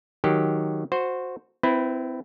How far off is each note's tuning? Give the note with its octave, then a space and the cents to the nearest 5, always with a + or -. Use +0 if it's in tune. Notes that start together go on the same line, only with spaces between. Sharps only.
D#3 +0 F#3 -5 G4 +0
F#4 -15 C5 +0
C4 -25 E4 +0 B4 +0